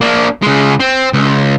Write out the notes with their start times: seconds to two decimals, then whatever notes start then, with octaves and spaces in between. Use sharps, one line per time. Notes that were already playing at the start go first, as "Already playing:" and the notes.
0.01 A#3 D4
0.43 C#3 G#3
0.80 C4
1.13 C#2